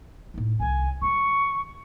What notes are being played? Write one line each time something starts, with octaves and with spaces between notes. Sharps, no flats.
A2 D#4
C2 D#3 G#5
D#3 G3 C#6